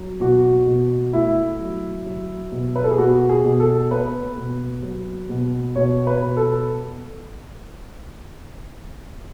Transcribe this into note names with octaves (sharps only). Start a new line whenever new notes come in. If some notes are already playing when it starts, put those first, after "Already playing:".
Already playing: F#3
B2 F#4
B2
A3 E4
F#3
F#3
B2
B4
A4
G#4
B2 F#4
G#4
B2
A4
B3 B4
B2
F#3
B2
B2 C#5
B4
B2
A4